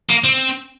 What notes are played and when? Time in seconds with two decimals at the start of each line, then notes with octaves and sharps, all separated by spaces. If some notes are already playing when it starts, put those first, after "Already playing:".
0.09 A#3
0.24 C4